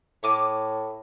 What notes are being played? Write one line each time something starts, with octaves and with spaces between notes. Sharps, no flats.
A2 C#5 D6 D#6